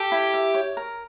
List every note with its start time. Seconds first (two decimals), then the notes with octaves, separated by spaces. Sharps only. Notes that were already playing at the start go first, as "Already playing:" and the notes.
Already playing: G4 A4
0.12 E4
0.34 E5
0.54 C#5
0.77 A#4